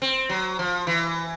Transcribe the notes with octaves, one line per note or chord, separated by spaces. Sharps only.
C4
F#3
F3
E3